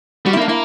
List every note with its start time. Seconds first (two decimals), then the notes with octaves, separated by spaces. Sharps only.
0.25 G3 F#4
0.33 E4
0.37 A#3
0.42 D4
0.48 A#3 E4